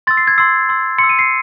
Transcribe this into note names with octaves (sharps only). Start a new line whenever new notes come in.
C6 E6 A6
C7
G#6
C6 E6 C7
C6 E6
C6 C#7
E6
D#7
C7